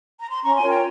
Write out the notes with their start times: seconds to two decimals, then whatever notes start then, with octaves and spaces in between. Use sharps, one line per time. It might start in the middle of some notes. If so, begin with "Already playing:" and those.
0.20 A#5
0.30 C6
0.43 C#4 A#5 C#6
0.55 G#5 C6
0.62 F4 A#4 C#5
0.68 G5 A#5